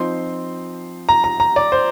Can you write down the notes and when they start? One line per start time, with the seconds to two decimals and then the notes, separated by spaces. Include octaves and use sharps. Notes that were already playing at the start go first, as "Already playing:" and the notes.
Already playing: F3 C4 D#4 C6
1.09 A#5
1.24 A#5
1.40 A#5
1.56 D5
1.72 C5